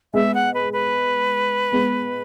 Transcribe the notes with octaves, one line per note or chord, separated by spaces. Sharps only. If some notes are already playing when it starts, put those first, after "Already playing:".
G#3 B3 E5
F#5
B4
B4
G#3 B3